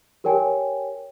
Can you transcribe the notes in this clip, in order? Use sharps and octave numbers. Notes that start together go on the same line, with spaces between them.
G4 A#4 C#5 G5 G#5